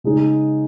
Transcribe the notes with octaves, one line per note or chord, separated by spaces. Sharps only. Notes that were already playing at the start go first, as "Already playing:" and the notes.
C#3 G#3 D#4 G#4